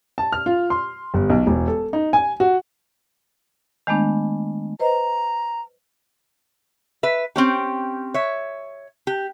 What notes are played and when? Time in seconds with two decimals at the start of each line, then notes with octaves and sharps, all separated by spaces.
0.18 A5
0.32 F6
0.46 F4
0.70 C6
1.14 G1
1.30 B1
1.47 E1
1.68 A4
1.93 D#4
2.13 G#5
2.40 F#4
3.87 D#3 G#3 A3 B3 D4
4.80 B4 C5 D#5 A#5
7.03 B4 E5
7.36 C4 C#4 G4
8.14 C#5 E5
9.07 G4